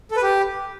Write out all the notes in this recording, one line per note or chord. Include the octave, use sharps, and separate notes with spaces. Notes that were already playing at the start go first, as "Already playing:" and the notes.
A4
B4
G4